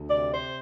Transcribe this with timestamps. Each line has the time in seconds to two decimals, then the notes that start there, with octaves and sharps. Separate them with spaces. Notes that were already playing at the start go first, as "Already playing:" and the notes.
Already playing: D2
0.09 C3 D5
0.33 C5